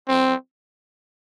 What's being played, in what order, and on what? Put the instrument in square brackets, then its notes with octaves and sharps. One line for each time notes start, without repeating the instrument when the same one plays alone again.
[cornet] C4